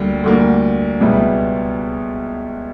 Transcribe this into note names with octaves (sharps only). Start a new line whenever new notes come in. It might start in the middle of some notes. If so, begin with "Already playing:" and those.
Already playing: D2 D3 G3 A#3
D2 D3 G3 A#3
C#2 B2 G3 B3 E4